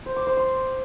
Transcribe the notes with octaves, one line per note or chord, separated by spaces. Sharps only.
C5
D6
C5
C6